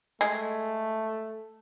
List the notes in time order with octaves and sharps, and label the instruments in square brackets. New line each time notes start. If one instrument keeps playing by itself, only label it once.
[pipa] G#3 [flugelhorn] A3